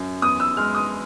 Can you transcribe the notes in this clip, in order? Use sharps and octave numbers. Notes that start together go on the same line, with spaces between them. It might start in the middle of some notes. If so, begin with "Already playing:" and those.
Already playing: F#2
E2 D#6
E6
G#3 F6
D#6